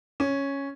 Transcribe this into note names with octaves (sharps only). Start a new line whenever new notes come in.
C#4